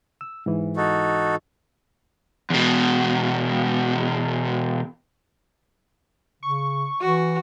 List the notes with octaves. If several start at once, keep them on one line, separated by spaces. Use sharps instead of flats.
E6
G#2 E3
D#4 F#4 A4
E2 B2
C#3 C#6
E3 F#4